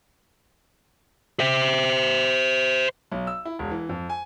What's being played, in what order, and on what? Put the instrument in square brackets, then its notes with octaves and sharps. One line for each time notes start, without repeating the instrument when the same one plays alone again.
[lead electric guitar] C5 E5
[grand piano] B1
E6
E4
E1
E3
F2
G#5